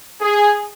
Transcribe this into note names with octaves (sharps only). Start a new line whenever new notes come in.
G#4